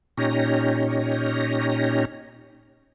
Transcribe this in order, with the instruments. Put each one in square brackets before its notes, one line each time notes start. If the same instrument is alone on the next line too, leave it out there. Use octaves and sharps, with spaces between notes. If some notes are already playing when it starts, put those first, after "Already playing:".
[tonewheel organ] A#2 C#4 D#4 G4 C#5 A#6